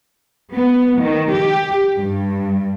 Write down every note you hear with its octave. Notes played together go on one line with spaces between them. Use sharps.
B3
D#3
G4
G2